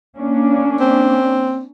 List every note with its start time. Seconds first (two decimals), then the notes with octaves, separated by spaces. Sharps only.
0.17 A#3 C#4 D4
0.80 C4